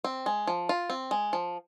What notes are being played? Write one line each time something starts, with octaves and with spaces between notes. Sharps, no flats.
C4
G#3
F3
F4
C4
G#3
F3